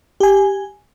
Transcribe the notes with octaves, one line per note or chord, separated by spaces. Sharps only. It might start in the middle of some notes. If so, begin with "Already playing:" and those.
G4 G#5